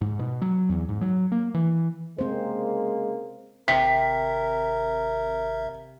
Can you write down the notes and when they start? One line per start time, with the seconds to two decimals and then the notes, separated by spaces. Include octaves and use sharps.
0.01 G#2
0.19 B2
0.42 F#3
0.70 E2
0.89 G#2
1.01 F#3
1.32 A#3
1.54 E3
2.19 C#3 G#3 A#3 C4 C5
3.68 G#1 C3 A#4 E5 B6